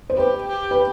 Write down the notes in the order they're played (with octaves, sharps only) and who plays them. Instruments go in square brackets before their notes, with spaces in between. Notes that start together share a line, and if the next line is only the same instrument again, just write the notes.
[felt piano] C5
[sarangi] G4 [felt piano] B4
[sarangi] G4
[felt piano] B4